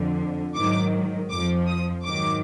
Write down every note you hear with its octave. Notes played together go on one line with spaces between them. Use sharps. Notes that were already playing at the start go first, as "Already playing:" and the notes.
Already playing: F2 D3 F3
G#2 D#3 F#3 D6
F2 F3 D6
D#6
G#2 D#3 F#3 D6